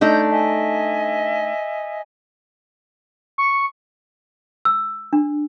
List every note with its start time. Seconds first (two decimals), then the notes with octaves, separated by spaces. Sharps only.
0.01 A3 D4 D#4 G6
0.30 D#5 E5 G#5
3.38 C#6
4.65 E6
5.13 D4